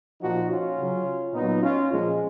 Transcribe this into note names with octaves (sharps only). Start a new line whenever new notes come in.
A#2 F3 D#4 F#4
C#4 F4
C#3 F#3
A#2 F#3 B3 D#4
C#4 F4
A#2 F3 G#3